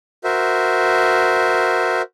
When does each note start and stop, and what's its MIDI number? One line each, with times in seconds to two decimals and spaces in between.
0.24 2.02 66
0.24 2.02 70
0.24 2.02 72
0.24 2.02 76